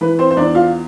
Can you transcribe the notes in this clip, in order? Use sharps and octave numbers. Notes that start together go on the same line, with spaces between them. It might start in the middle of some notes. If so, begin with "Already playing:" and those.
E3 B4
C4 C5
C5
E2 D4 D5
F4 F5